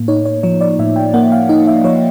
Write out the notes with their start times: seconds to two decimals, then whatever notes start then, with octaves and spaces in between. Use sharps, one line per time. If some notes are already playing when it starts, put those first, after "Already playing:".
Already playing: A2 A#3
0.08 D#4 C#5
0.26 C#5
0.43 F3 C#5
0.61 D5
0.79 A2 E5
0.96 G5
1.14 A#3 F#5
1.32 F5
1.49 D#4 D#5
1.67 E5
1.84 F3 C#5